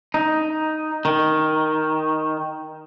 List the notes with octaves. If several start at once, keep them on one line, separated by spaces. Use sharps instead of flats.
D#4
D#3